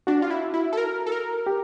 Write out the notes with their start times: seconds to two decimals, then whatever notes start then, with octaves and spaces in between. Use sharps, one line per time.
0.07 D4 F#4
0.22 F4
0.30 E4
0.54 E4
0.73 A4
0.77 A#4
1.06 A4
1.12 A#4
1.47 G4